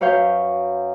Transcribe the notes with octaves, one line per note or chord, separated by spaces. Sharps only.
F#2 B4 C#5 F5 G6